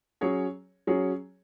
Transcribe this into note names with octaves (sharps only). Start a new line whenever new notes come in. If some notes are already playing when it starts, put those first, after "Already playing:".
F#3 C#4 G#4 C#5
F#3 C#4 G#4 C#5